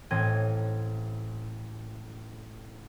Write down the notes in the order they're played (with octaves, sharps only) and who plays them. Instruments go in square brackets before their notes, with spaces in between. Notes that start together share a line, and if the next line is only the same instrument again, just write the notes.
[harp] A1 A2 C4 D#5 G#6 D#7